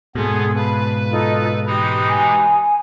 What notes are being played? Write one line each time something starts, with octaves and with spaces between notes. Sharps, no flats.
G#2 B2 B3 G#4 A4 C6
B4 F5 A5 B5
D#4 F4 A4
E3 G#3 D#4 G4 B5 D#6
G#5